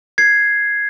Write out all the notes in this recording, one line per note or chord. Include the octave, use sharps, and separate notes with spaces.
G#6 C7